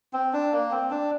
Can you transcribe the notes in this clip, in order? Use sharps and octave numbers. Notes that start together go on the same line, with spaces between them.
C4
D4
A#3
C4
D4